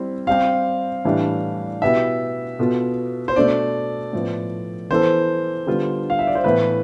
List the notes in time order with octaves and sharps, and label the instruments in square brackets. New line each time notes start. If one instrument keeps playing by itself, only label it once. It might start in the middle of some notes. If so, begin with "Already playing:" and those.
Already playing: [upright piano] G3 C4 E4
[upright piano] G3 C4 G4 [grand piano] F5
[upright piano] A2 E3 G3 D4
[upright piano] B2 B3 E4 G4 [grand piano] E5
[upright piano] B2 B3 F4 A4
[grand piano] C5
[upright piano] B2 A3 D4 [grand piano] D5
[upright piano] A2 F3 B3
[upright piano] E3 B3 E4 A4 [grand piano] C5
[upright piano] D3 G3 B3 F4
[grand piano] F5
E5
D5
C5
[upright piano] A2 E3 B3 [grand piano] B4